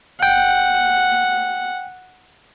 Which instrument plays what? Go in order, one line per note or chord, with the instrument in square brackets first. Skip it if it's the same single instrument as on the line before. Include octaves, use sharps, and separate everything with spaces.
[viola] F#5 [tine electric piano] G5